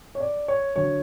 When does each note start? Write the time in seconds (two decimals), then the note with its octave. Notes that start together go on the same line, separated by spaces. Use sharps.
0.15 C#5
0.20 D5
0.48 C#5
0.76 D3 F#3 C#5